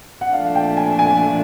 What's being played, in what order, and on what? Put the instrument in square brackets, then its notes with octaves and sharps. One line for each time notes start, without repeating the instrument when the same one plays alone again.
[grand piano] F#5
[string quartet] A#2 F3 A3 D4 [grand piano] F5
[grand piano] G5
G#5
G#5